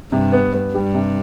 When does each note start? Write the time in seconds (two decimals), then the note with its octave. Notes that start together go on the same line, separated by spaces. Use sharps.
0.12 G2 C3
0.32 B3
0.53 B3
0.74 G2 G3
0.94 C3